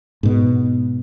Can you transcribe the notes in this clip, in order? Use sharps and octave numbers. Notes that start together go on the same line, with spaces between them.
G#2 B2